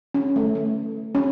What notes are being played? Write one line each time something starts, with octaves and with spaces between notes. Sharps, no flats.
C#4
A3
A3
C#4